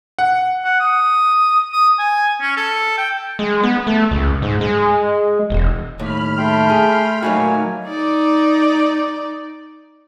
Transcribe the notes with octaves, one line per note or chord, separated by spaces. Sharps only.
F#5
F#5
D#6
D#6
G#5
C#4
A4
G5
G#3
B3
A3
C#2
G#2
G#3
E1
D#2 A2 B5 F6
A3 G5 C6
G#4
F#3 A3 A#3 D#4 F#4 G#5
D#4 D5